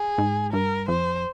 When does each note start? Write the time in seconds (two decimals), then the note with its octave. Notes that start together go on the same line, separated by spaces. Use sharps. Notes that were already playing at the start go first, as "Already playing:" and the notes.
Already playing: G#4
0.18 G#2
0.52 G2 A#4
0.88 F2 C5